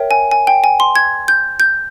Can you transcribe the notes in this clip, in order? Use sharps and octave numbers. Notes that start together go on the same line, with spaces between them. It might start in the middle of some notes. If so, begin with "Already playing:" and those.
Already playing: A#4 C#5 E5 G5
G#5
G#5
G5
G#5
C6
G#6
G6
G6